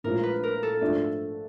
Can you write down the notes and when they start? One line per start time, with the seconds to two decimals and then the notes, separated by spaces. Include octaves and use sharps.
0.04 A#1 A2 F3 G#3 A#4
0.23 B4
0.43 A#4
0.63 A4
0.81 G#2 F3 A3 D4